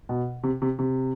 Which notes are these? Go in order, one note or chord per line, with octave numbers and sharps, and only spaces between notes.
B2
C3
C3
C3